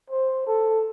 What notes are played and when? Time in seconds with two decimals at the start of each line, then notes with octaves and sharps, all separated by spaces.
0.10 C5
0.47 A4